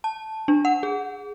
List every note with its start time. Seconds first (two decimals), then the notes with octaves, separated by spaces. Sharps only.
0.04 A5
0.48 D4
0.65 F#5
0.83 G#4